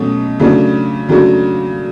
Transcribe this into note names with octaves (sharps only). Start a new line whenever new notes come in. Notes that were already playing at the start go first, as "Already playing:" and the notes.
Already playing: B2 F#3 A3 C#4
C#3 F#3 A3 D4 F#4
C#3 F#3 A3 D4 F#4